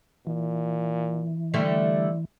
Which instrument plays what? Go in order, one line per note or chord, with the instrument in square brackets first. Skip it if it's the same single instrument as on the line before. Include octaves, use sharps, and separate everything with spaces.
[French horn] A#2 [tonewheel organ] E3
[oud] D3 G3 A3 [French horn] D5